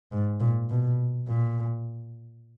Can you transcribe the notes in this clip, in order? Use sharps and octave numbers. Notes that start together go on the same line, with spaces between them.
G#2
A#2
B2
A#2